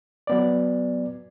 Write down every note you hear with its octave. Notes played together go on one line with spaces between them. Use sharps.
F#3 B3 D5